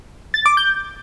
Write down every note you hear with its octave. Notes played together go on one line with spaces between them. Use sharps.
A6
D6
G6